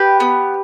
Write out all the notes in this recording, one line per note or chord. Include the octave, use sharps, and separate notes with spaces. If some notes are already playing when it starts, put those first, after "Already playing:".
Already playing: G4 B4
B3